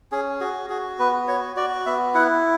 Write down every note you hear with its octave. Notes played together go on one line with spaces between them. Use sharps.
C#4 G#4
F#4 G#4
F#4 G#4
B3 B4
F#4 C#5
F#4 D5
B3 E5
E4 F#5